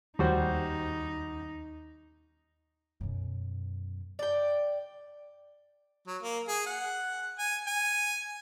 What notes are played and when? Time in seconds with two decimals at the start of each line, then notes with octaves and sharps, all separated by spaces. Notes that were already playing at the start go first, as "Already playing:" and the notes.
0.19 D#2 G3 D#4 F#4 C5
3.01 F#2 B2
4.19 D5 G5
6.07 F#3
6.22 A#3
6.48 G#4
6.66 F#5
7.39 G#5
7.67 G#5